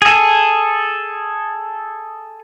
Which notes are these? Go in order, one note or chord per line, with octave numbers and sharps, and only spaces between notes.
G#4 A4